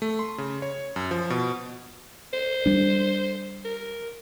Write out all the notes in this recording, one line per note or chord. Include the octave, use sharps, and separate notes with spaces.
A3
C6
C#3
C#5
F#2
F3
B2
C5
G3 D4
A#4